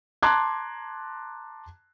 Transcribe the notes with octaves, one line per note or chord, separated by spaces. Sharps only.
A5 A#5 C6 D6 F#6 G#6